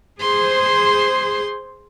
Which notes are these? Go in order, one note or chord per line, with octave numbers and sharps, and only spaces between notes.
G#4 C5 C6